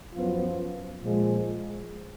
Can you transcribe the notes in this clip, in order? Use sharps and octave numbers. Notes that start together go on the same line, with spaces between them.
F#2 F3 B3 F4
A#2 F3 G#3